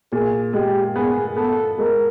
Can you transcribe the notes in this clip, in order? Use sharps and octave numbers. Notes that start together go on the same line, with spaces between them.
A#2 G#4
G#3 G4
B3 G#4
B3 A4
G#3 A#4